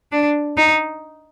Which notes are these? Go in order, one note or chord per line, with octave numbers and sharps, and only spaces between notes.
D4
D#4